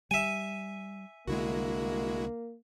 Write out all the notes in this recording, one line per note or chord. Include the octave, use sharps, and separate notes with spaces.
G3 E5 G#5
C2 D3 G#3 A#3 D4 E4 F#4